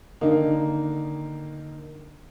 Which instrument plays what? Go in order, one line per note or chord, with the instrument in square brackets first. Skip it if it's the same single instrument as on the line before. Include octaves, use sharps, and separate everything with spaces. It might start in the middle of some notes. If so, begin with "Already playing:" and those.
[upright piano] D3 D#3 A#3 D#4